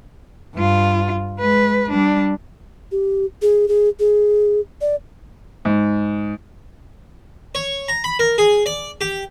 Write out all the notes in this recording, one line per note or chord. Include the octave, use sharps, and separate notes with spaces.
G2 F4
G#3 B4
G3 D4
G4
G#4
G#4
G#4
D5
G#2
C#5
A#5
B5
A#4
G#4
D5
G4